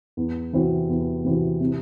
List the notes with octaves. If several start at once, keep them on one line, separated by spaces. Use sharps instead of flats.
E2
C3 E3 C4 F#4
E2
C3 E3 C4 F#4
C3